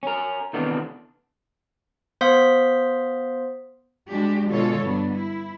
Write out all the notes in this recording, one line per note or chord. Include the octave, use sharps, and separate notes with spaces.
C#4 A#4
C3 D#3 E3 A3 B3 D4
B3 C5 F5 C6 D#6 B6
G3 G#3 D4 F#4 G4
B2 D3 G#3 F4 A4 C#5
G2 B3 D4
E4